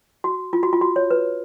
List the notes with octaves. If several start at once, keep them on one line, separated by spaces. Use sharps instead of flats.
F#4
F4
F#4
F4
F#4
C#5
B4